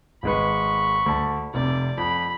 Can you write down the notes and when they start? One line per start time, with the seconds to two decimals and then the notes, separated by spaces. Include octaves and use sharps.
0.23 G#1 G#3 B4 B5 C#6
1.06 D2 A5
1.54 F1 C3 D5
1.97 F2 B5